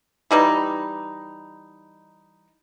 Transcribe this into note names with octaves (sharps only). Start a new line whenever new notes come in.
E3 G3 D#4